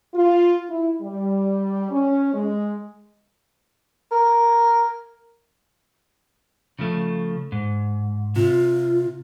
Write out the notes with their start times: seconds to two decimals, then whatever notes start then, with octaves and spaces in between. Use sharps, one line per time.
0.14 F4
0.70 E4
1.02 G3
1.91 C#4
2.34 G#3
4.12 A#4
6.79 C#3 F3 A3
7.52 G#2
8.36 C3 F4